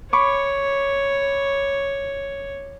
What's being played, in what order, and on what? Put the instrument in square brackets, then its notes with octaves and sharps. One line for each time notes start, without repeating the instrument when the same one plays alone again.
[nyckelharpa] C#5 [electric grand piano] B5 C#6 D6